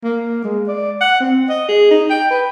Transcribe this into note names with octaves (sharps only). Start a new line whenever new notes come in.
A#3
G#3
D5
F#5
C4
D#5
G#4
D#4
G5
B4